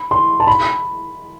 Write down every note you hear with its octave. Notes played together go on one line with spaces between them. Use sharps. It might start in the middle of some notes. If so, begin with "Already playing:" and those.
Already playing: B5
C6
A5
B5